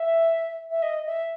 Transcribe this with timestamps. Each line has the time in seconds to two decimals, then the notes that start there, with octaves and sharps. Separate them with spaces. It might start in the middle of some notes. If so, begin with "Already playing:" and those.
Already playing: E5
0.71 E5
0.82 D#5
1.06 E5